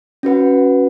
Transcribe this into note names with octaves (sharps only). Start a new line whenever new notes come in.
C#4 F#4 B4 F#5